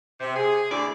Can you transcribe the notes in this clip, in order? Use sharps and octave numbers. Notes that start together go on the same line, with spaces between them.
C3
G#4
D2 E4 D5